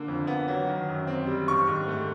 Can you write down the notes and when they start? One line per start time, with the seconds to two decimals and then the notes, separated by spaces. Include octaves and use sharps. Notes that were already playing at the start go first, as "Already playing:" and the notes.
Already playing: D3 A#3
0.08 F2
0.27 B3
0.48 F#3
0.67 D#3
0.88 F#2
1.07 C4
1.27 G3
1.48 D#3 C#6
1.67 G#2
1.88 A3